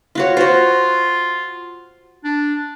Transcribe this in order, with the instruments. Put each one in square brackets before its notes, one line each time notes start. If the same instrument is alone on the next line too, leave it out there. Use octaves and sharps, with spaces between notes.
[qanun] F4 F#4 C#5
[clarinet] F4 [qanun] F#4 C5
[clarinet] D4